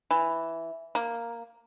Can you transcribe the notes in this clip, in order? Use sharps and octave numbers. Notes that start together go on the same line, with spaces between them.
E3
A#3